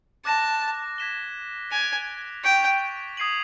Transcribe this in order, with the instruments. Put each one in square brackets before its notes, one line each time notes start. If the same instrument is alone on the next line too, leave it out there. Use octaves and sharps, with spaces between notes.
[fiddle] A5 [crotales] D6 F#6 A#6
[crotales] G#6 B6 E7 G7
[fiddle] G#5 [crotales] A6 D7 F7
[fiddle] G5 [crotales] C#6 F#6 B6 D7 F7
[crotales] D#6 G#6 C7 D#7 F#7